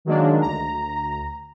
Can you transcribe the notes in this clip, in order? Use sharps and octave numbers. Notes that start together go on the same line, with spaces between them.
D#3 F#3 G#3 A#3 D4
D2 A#5